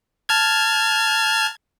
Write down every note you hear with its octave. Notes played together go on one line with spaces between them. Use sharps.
A5 F6 G#6